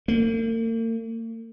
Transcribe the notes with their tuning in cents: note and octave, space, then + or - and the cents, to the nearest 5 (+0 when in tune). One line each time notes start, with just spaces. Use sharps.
A#3 -45